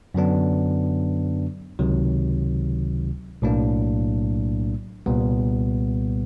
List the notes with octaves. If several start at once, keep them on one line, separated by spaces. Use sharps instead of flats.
F#2 D3 F#3 B3 D4
C#2 C3 D#3 F#3
B1 A2 F#3 A#3 D4
C2 A#2 G3 B3